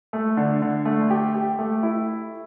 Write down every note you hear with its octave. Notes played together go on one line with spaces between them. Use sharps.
A3
D3
D3
A3
G4
G4
A3
E4